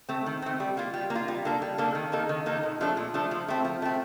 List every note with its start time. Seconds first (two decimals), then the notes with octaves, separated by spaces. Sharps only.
0.09 A3 C4
0.26 D#3
0.42 A3 C4
0.60 G3
0.77 A#3 F4
0.94 G3
1.10 A#3
1.15 F4
1.28 G3
1.45 A#3 D4 A4
1.62 G3
1.78 A#3 D4 A4
1.95 D#3
2.12 A#3 D#4 A4
2.29 D#3
2.46 A#3 D#4 A4
2.63 A#2
2.80 F3 A3 D4 A4
2.97 A#2
3.14 F3 A3 D4 A4
3.31 F3
3.48 A3 C4
3.65 F3
3.82 A3 C4